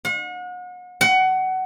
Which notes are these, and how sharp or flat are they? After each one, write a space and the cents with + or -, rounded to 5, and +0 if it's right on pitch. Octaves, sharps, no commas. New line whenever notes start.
F#5 -40
F#5 +20